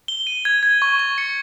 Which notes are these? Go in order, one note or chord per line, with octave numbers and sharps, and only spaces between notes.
G7
D#7
G#6
G#6
C#6
C#6
C#7